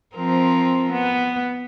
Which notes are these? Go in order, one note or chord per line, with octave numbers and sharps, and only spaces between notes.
F3 C4 A#4
B3